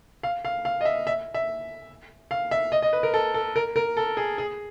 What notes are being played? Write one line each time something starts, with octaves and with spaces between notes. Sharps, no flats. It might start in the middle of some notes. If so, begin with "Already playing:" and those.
F5
F5
F5
D#5
E5
E5
E5
F5
E5
D#5
D#5
B4
A#4
A4
A4
A#4
A#4
A4
G#4
G#4